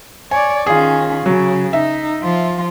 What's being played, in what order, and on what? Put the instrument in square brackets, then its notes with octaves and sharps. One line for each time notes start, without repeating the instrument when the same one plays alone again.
[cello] C#5 D5 [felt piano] G#5
[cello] D#3 C#4 [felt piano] F4 G#4
[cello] C#3 [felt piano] F#3
[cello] D#4 [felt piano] E5
[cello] F3 F4